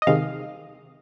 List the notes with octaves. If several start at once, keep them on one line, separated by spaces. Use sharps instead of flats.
D#5
C3 D#3 G#3 F5